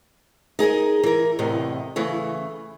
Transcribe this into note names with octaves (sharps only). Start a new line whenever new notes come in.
D#4 G#4 A#4 D#5
E3 A#4
E2 A2 C3 D#5
C#3 E3 A3